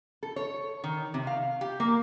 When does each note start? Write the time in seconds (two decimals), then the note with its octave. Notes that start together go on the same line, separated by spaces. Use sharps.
0.23 A4
0.36 C#5
0.84 D#3
1.14 C3
1.27 F5
1.61 G4
1.80 A#3